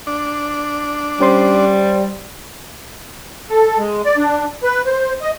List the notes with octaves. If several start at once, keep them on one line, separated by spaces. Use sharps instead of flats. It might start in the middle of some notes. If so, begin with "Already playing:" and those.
D4
G3 C#4 C5 C6
A4
G#3
D5
D4
B4
C5
D#5